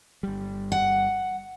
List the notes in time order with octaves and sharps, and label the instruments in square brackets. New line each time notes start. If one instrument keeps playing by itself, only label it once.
[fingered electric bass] G1 G3
[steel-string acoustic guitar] F#5